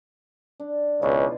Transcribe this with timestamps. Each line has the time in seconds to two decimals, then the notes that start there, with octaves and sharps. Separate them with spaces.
0.60 D4
1.02 C#2 B2 E3 F4